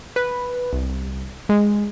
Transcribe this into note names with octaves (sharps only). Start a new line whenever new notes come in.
B4
C2
G#3